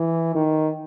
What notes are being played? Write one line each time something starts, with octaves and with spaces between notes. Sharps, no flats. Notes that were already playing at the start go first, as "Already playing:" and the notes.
Already playing: E3
D#3